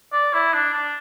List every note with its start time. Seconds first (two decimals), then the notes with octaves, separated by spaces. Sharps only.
0.13 D5
0.33 E4
0.53 D4
0.74 D4